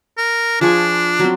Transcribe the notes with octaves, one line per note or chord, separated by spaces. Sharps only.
A#4
F3 D4 G#4 C#6
F#3 C4